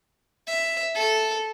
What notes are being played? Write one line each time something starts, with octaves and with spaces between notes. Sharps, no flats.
E5
A4